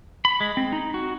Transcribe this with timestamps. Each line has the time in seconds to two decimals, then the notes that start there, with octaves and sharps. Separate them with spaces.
0.25 B5
0.40 G#3
0.57 C4
0.72 D#4
0.94 F#4